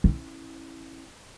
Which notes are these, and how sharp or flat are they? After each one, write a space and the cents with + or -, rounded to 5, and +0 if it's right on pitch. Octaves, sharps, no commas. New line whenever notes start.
C#4 -35 E4 -10